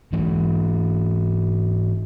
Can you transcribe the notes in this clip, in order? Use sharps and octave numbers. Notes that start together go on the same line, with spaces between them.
G#2 E3 G#3